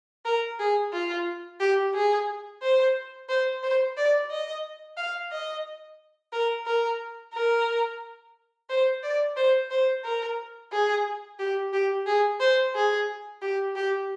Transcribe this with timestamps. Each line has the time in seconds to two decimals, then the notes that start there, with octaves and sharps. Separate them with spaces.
0.25 A#4
0.60 G#4
0.93 F4
1.60 G4
1.95 G#4
2.62 C5
3.29 C5
3.63 C5
3.97 D5
4.31 D#5
4.97 F5
5.32 D#5
6.33 A#4
6.66 A#4
7.34 A#4
8.70 C5
9.03 D5
9.37 C5
9.71 C5
10.04 A#4
10.72 G#4
11.39 G4
11.73 G4
12.06 G#4
12.40 C5
12.75 G#4
13.42 G4
13.76 G4